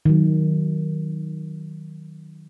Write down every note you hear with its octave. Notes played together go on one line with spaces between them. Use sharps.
D#3 F#3